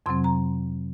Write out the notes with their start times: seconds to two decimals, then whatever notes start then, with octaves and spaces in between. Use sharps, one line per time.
0.06 F2 C3 F#3 C4 C6
0.24 A#5